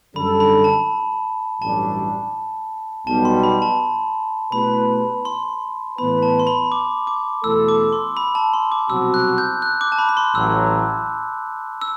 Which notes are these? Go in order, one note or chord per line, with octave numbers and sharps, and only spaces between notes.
F#2 D3 G3 D4 A4 B5
B5
A5
A1 G2 F#3 A3 D4 A5
B1 B2 G3 A5
C6
B5
A5
B2 A3 E4 G4 B4 B5
C6
A2 E3 B3 E4 B4 B5
A5
C6
B5
D6
D6
E2 B2 A3 E4 A4 E6
D6
C6
B5
A5
C6
D6
C2 B2 F#3 C4 F#4 E6
F#6
G6
F#6
D6
A5
B5
B5
C6
A1 A2 F#3 E6
E6